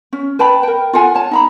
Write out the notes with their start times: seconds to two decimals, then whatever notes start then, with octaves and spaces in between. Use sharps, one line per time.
0.13 C#4
0.39 B4 G5 A5 B5
0.63 A#4 G5
0.93 F4 A4 F#5 G#5
1.14 C#5 A5
1.31 D#4 A#5 B5